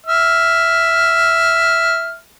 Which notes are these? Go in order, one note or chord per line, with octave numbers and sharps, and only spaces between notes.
E5 F6